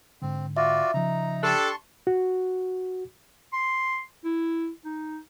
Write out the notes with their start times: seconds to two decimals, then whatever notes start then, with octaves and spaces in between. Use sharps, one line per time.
0.22 G#2 D3 C4
0.57 F4 F#4 D5 E5
0.94 C#3 F3 D#4 A#5
1.43 D4 G4 A4 A5 C6 C#6
2.07 F#4
3.53 C6
4.24 E4
4.85 D#4